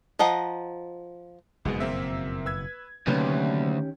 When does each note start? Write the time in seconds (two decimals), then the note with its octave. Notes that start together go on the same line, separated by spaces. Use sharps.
0.19 F3 D#5 F#5 A#5
1.65 F#1 F2 G#2 B2 G#3 B3
1.80 A#3 C4 E5
2.46 B4 E6 G#6
3.07 D2 C3 D#3 F#3 A#3 C#4 G4 B4